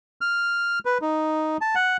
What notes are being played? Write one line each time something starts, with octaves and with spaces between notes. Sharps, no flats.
F6
B4
D#4
A5
F#5